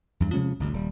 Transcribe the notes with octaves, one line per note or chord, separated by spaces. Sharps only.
E2 G2
C3 F3 G#3 C#4
G1 D2
D#1 G3